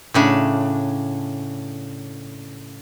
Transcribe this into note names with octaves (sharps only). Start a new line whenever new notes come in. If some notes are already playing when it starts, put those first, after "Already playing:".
A2 C#3 D4